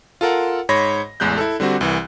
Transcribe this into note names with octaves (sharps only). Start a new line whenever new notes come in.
F4 A4 A#4 F#5
G#2 C#5 B5 A#6
A1 E2 G#3 F#6 G6
E4 A4
D3 G3 C4 F#4
C2 E3